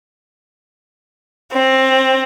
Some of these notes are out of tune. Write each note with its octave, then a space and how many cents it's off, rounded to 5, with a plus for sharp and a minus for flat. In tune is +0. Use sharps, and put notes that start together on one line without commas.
C4 +15